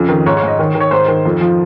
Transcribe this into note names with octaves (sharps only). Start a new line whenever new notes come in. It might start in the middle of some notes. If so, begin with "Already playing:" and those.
Already playing: F2 C#3
D#3
G#2 C#5
C#5
G#2
D#5
D#3 C#5
D#3
C#5
G#2 C5
D#3
F2
F3